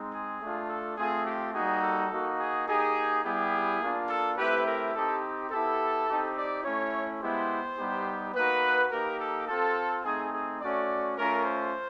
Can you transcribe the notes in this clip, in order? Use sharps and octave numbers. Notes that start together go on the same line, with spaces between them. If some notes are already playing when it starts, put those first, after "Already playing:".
Already playing: G#3 C4 D#4
G#4
A3 D4 F4
A4
A3 C4 F4 G#4
G4
G3 A#3 D#4 F#4 G#4
A4
A#3 D#4 F#4
G#4
A#3 D#4 G4 G#4
G3 B3 E4 G4 G#4
A#3 D4 F4
A4
A3 C4 E4 G4 B4
A#4
C4 D#4 G4 A4
B3 E4 G4 A4
C4 D#4 G4
D5
A3 C#4 E4 C#5
G#3 B3 E4 G4 C5
G3 B3 D#4 G4
A#3 D#4 F#4 B4
A#3 D#4 G4 A#4
A4
C4 F4 A4
A3 C4 D#4 G#4
G#4
A3 C#4 F#4 D5
A3 C#4 F4 A#4
C5